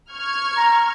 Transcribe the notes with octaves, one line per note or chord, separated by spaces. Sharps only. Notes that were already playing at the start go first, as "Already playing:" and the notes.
C#6 F6 G#6
A#5